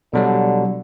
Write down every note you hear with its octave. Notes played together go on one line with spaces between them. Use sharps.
B2 D3 F#3 G3